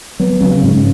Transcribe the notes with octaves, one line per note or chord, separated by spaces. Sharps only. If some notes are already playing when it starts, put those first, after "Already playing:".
F#3 B3
C#3 F#3
G#2 C#3